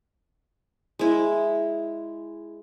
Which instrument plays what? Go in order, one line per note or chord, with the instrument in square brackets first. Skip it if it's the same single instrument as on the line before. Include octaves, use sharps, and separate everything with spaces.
[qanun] G#3 E4